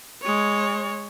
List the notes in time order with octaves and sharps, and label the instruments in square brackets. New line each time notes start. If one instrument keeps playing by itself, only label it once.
[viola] G#3 C#5